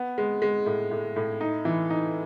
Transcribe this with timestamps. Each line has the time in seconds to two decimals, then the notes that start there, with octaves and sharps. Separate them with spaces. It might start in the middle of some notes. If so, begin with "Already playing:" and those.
Already playing: B3
0.18 G#3
0.42 G#3
0.66 A2
0.91 A2
1.16 A2
1.41 D#4
1.65 E3
1.90 D#4